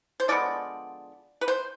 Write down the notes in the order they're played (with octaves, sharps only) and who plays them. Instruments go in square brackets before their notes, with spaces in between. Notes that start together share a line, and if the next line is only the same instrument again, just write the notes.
[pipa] C5
D3 F3 G#3 B3 D5
B4
C5